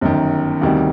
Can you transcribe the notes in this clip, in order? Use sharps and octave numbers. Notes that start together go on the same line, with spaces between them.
G1 F#2 D#3
D2 C3 D#3 G3